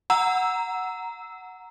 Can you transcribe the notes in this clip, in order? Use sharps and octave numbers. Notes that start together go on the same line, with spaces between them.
F#5 A#5 E6